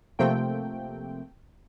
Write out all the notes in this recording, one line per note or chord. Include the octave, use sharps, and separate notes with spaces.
C3 F3 A3 A#3 C4 G5